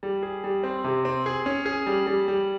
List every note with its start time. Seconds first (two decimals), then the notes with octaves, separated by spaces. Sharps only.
0.03 G3
0.23 G#4
0.44 G3
0.63 C4
0.84 C3
1.05 C4
1.26 G#4
1.46 C#4
1.66 G#4
1.87 G3
2.07 G3
2.28 G3